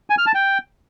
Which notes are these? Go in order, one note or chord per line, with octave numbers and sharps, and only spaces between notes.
G#5
F6
A5
G5